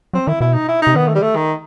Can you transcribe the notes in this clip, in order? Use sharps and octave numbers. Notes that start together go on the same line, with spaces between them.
F#3 C4
D#3 E4
B2 E4
D#4
E4
C3 D#4
D#3 B3
A3
G3
A3
D#3